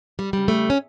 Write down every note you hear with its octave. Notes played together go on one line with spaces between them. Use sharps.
G3
C#3 G3
A3
C#4